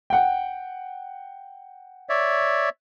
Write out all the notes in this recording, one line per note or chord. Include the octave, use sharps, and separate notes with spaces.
F#5 G5
C#5 D5 E5